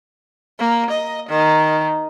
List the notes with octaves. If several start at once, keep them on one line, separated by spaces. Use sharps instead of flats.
A#3
D#5
D#3